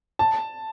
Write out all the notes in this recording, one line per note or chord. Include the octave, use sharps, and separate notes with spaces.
A5